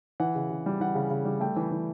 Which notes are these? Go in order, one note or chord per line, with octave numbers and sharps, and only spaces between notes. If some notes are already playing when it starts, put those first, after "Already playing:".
E3 F#5
C#3
C#3
G3
E3 F#5
C#3
C#3
G3
A3 G5
E3
E3